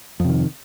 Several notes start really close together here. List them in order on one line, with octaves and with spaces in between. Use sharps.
F2 C3 D#3